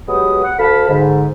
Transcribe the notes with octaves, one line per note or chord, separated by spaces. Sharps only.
F#3 G#3 B3 G4 B4 D#6
F#5
D2 A4 F5 A5 B5
G#2 D3